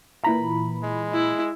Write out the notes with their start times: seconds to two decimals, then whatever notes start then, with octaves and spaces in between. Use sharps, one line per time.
0.24 A#2 E3 A#5 B5
0.84 G#3
1.13 E4